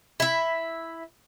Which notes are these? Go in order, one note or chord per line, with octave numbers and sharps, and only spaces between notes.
E4 E5